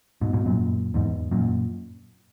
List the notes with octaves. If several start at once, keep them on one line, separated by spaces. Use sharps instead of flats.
G#2 B2
G#2 B2
F#2 A#2
E2 G#2
F#2 A#2